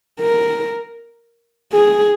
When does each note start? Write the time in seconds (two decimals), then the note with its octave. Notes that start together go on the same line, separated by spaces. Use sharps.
0.20 A#4
1.73 G#4